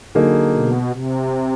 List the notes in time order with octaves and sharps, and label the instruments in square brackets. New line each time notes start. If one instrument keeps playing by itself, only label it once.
[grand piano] D3 F#3 A#3 D#4 G#4
[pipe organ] B2
C3